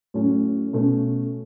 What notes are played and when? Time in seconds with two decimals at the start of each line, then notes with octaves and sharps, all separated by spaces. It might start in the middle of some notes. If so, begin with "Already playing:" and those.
0.14 A2 F#3 A3 C#4
0.73 B2 A3 C#4